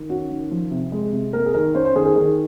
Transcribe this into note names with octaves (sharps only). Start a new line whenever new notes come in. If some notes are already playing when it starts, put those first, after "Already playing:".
Already playing: D#3
C#4 F#4
D#3
F3
C3
G#3
C3
A#3 A#4
G#4
D#3 A#4
C#4 C5
C5
D#3 G#4
G#4
D#3 G#4